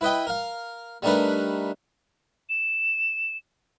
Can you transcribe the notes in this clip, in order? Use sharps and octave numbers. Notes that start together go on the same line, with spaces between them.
E4 B4 D#5 G5
A#4 F5
G3 A3 D4 D#4 A#4 B4
E7